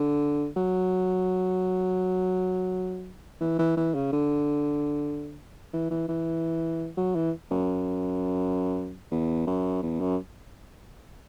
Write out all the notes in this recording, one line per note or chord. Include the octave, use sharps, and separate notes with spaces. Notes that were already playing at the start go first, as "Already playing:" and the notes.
Already playing: D3
F#3
E3
E3
E3
C#3
D3
E3
E3
E3
F#3
E3
F#2
E2
F#2
E2
F#2